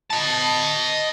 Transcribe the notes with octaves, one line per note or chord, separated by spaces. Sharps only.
D#5 A5